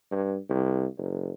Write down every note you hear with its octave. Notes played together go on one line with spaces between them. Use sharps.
G2
C2
F#1